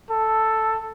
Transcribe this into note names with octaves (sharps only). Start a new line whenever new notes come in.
A4